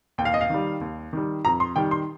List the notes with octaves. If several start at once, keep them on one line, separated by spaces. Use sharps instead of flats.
D#2 G5
F5
D#5
F5
D#3 G3
D#2
D#3 G3
F2 A#5
C6
D#3 G3 G5
C6